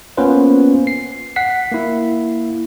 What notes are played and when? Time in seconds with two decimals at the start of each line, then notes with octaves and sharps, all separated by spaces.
0.17 A#3 B3 C#4 F4 B4 C5
0.87 C7
1.36 F#5 B6 C7
1.72 A#3 E4